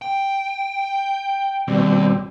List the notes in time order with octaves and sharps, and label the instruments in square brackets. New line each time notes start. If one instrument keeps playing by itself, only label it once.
[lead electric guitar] G5
[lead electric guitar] D#2 [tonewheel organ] B2 G3 C4